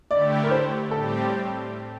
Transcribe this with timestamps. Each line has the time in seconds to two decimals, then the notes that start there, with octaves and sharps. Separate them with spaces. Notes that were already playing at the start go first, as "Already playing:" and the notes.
0.10 D3 A3 E4 G4 D5
0.43 A#4
0.51 C5
0.91 A2 G3 C4 G4 A4